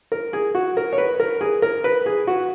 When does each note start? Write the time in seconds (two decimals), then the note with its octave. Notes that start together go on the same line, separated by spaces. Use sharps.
0.12 A#4
0.33 G#4
0.55 F#4
0.77 A#4
0.93 C#5
0.98 B4
1.20 A#4
1.41 G#4
1.62 A#4
1.84 B4
2.06 G#4
2.27 F#4